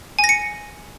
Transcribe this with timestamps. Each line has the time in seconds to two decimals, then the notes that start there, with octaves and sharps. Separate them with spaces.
0.19 G#5
0.24 A#6
0.29 C#7